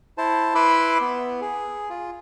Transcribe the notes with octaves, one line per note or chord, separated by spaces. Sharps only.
E4 C5 A5
E4 B4 B5 C6 D6 E6
B3
G#4
F4